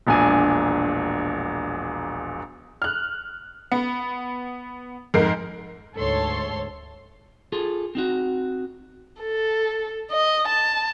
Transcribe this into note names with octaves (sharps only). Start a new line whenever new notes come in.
E1 A#1 D4 G#5
F6 F#6
B3
F2 G#2 A#4 C7
D2 G#2 A4 C#5 C6
F4 G#4 A4
C4 D#4 F#4
A4
D#5
A5